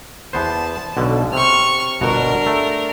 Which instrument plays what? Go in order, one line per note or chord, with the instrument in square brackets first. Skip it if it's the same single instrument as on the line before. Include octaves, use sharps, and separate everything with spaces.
[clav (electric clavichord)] E2 B3 C5 [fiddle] A5
[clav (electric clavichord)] B1 B2 D3
[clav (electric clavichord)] C3 [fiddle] C#6 F6
[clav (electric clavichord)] G1 B2 F#4 [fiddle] D4 A#4
[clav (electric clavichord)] A3